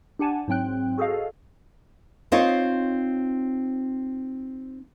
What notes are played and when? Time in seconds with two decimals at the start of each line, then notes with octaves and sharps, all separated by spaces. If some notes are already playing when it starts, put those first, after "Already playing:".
0.19 D4 G4 F#5 G#5 A5
0.48 G#2 F#3 C4 G5 F#6
0.98 F#4 G#4 A4 C5 D#5 F5
2.32 C4 D#4 F4 C5 C#5